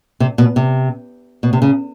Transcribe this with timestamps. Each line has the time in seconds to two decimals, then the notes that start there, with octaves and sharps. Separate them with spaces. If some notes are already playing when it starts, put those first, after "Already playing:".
0.20 C3
0.38 B2
0.56 C3
1.43 B2
1.53 C3
1.62 C#3